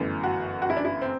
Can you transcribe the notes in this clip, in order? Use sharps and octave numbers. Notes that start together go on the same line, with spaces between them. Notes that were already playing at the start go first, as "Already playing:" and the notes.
Already playing: G1 F#2 E3 A3
F#4
F#4
E4
D4
E4
C4